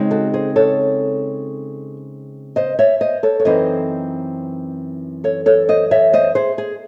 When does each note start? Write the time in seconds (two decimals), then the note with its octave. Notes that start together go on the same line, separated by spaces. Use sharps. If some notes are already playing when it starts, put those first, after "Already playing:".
Already playing: C#3 G#3 C4 D#4
0.11 F#4 A4
0.34 G#4 C5
0.56 A4 C#5
2.56 C5 D#5
2.79 C#5 E5
3.01 C5 D#5
3.23 A4 C#5
3.40 C#5
3.45 F#2 E3 C4 D#4 C5 D#5
5.24 A4 C#5
5.46 A4 C#5
5.69 C5 D#5
5.91 C#5 E5
6.13 C5 D#5
6.35 G#4 C5
6.58 G#4